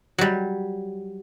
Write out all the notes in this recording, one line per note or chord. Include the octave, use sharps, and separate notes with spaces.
F#3 G3